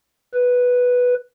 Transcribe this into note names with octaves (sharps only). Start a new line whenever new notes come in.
B4